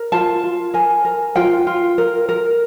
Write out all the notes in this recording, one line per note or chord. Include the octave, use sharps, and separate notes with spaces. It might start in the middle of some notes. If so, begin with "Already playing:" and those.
Already playing: A#4
F4 A5
F4
A#4 G#5
A#4
F4 G5
F4
A#4
A#4